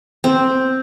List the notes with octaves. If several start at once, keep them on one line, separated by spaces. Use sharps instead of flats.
C4